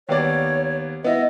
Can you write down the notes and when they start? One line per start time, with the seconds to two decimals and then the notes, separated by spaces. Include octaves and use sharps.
0.09 D#2 B3 C#5 D5
1.04 B3 E4 D#5